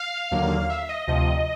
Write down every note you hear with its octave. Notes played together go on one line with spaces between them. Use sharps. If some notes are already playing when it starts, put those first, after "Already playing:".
Already playing: F5
D#2 D3 F#3 A#3
E5
D#5
D2 C3 F3 D#5